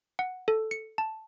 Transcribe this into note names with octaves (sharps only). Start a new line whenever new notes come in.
F#5
A4
C#7
A5